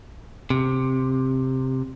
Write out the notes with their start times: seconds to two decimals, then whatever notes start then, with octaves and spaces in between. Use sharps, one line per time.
0.50 C3